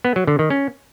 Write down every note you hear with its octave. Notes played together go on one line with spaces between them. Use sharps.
B3
F#3
D3
D#3
C#4